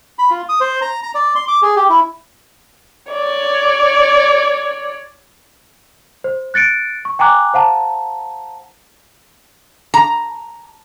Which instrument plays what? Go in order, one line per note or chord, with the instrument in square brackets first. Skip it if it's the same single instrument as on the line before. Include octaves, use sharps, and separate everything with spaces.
[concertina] B5
F4
D#6
C5
A#5
A#5
D5
C6
D6
G#4
G4
E4
[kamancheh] C#5 D5
[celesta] C5
F#6 A6 C#7 D7
C#6
G5 G#5 A#5 D6 F#6
C5 F5 F#5 A5 A#5
[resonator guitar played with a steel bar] A#5